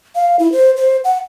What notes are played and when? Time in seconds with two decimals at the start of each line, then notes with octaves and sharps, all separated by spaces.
0.15 F5
0.39 E4
0.52 C5
0.77 C5
1.04 F#5